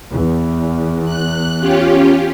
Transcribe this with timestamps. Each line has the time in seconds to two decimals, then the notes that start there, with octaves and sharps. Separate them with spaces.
0.12 E2
1.04 F#6
1.60 C#4 F4 G4